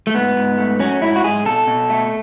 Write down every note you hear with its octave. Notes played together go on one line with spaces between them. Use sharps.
A3
G#2 B3
G#2
A3
F#3 C#4
G#2 E4
F#4
G#2 G#4
B2 A4
B2
A3